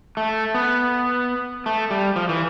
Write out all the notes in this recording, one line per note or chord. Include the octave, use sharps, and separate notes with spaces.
A3
B3
A3
G3
F3
E3